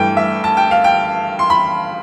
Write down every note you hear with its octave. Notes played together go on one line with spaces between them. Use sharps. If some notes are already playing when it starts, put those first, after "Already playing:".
Already playing: G2 E3 A3 G5
E5
A5
G5
F5
G5
C6
B5